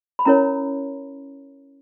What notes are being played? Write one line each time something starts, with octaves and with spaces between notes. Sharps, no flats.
B5
C#4 E4 A#4 C#5 A#5